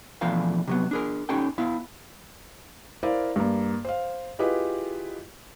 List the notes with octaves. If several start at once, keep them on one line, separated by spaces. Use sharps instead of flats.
E2 B2 F3 A3 D4 F5
C3 F#3 B3
D4 G#4 A#4
C#4 D#4 G4 A4 G5
B3 E4 F5
E4 A#4 C5 D5 F5
G2 A#3
C5 F5
E4 F4 G4 G#4 B4 D#5